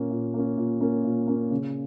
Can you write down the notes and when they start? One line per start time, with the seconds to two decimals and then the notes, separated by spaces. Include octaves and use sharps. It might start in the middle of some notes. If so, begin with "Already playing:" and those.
Already playing: A#2 A#3 C#4
0.11 A#2
0.34 A#3 C#4
0.57 A#2
0.81 A#3 C#4
1.04 A#2
1.28 A#3 C#4
1.51 C#3